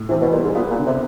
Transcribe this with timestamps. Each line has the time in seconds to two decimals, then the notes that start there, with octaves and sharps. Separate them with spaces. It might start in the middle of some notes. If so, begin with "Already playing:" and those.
Already playing: A2
0.09 C3 E3
0.21 B2
0.32 A#2 G3
0.43 G#2
0.55 A#2 B3
0.70 A#2
0.78 D3
0.85 C3